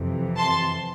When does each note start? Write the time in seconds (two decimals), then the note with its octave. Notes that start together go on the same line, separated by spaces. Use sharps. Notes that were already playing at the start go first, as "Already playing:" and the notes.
Already playing: F2 C3 E3
0.38 A5 C6